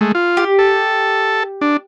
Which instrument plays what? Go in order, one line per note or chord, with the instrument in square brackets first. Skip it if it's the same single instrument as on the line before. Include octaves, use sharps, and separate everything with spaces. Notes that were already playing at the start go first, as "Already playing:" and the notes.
[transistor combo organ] G#3 A3
F4
[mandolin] G4
[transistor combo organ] A4
D4